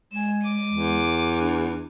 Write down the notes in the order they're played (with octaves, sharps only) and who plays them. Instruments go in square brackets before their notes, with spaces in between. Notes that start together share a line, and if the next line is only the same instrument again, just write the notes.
[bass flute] G#3 [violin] G#5 E7
[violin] D6 D#7
[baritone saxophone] E2
[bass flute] D4